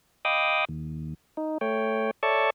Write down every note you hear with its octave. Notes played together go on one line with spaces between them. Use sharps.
D#5 F5 G5 B5 D6 D#6
D#2
D#4
A3 C#5 G5
A4 C#5 D5 E5 A5 C#6